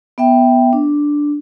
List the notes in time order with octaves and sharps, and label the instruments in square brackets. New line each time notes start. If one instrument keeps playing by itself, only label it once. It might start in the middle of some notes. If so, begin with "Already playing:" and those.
[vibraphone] B3 E5 G5
D4